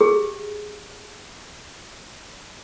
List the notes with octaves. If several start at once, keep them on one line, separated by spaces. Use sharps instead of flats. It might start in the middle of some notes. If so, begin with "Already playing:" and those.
G4 G#4